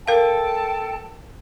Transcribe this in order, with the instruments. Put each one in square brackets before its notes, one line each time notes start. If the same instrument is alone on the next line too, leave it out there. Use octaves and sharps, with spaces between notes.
[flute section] A4 G5 A5 [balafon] A#4 F5